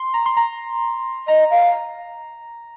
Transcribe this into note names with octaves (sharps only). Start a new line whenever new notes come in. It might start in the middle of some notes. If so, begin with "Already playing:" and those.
Already playing: C6
A#5
C6
A#5
D#5 A#5
F5